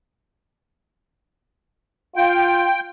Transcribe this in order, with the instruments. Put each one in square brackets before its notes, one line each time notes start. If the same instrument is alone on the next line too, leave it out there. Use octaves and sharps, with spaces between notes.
[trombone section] F4 [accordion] G5